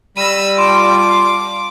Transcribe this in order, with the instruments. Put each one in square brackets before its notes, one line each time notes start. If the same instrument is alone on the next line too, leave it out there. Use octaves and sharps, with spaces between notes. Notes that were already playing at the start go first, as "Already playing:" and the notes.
[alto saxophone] G3 [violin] B5 E6 [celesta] A#6 D#7
[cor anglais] F4 [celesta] A5 C6 [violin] D6